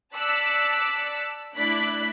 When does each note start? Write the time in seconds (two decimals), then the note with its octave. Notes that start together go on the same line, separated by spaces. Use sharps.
0.14 D5 A5 E6 F#6 B6 C#7
1.56 A3 D4 E4 D5 F#6 B6